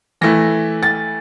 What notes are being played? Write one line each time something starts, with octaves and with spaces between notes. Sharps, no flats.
E3 A3 E4 A#6
A6